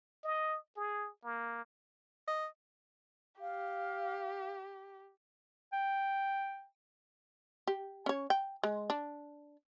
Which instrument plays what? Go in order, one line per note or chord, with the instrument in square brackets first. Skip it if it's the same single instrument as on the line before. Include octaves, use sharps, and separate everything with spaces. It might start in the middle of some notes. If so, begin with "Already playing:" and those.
[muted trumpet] D#5
G#4
A#3
[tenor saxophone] D#5
[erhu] G4 [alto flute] F5
[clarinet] G5
[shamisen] G4
C#4 C#5
G5
G#3
D4